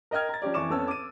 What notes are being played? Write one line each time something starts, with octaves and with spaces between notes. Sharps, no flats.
A#4 D#5 G5 F6 G#6
A#5 A6
F3 C#4 G4 D5
F2 E3 G#5 C#6 D6 E7
F2 B3 C#4 A4 E6
D6 D#7